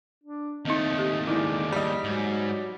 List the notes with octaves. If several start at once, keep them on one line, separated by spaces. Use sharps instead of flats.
D4
D#2 A3 C4 D#4 D#5
G4
D#3 G#3 E4 D5
G3 D#5
G#2 F#3